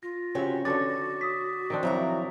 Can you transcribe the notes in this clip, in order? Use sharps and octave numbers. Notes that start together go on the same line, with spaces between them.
F4 A#6
C#3 C4 F#4 G4 C#5
D3 F#4 A4 B4 C#5 D6 A6
D#6 B6
D#3 C4 D4
F2 F#3 E4 A#5